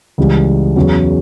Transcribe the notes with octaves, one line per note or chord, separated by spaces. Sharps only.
C#2 C#3 E3 G3
E2 C#3 F#3